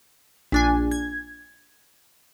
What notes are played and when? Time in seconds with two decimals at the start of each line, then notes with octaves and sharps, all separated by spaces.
0.52 A#1 D4 G#5
0.91 G#6